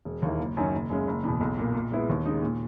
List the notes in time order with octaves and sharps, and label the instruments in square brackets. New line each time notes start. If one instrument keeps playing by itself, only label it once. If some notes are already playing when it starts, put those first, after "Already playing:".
[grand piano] E1
D#2 D#3 A#3 E4
F#1
F#2 D#3 F#3 C#4
F#1
F#2 C#3 G#3 C#4
F#1
E2 B2
B1
A#2 A#3
A#2
G#3 B3 E4
D#2
C#3 G#3 D#4
A#2